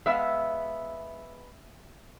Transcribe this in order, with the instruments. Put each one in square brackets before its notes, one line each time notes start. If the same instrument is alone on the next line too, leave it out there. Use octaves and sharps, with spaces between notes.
[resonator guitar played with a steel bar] G#3 B3 F5 [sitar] E5